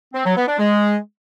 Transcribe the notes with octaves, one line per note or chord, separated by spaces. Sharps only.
C4
F#3
B3
D4
G#3